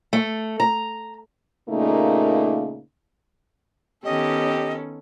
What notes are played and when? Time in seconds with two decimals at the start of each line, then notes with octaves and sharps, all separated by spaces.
0.13 A3
0.60 A#5
1.68 A#2 C#3 A3 A#3 D#4
4.05 D#3 B3 C#4 G4 A4 D#5